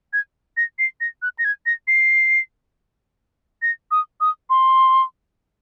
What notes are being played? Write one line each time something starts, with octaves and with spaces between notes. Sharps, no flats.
G#6
A#6
C7
A#6
F#6
A#6
G#6
A#6
C7
A#6
D#6
D#6
C6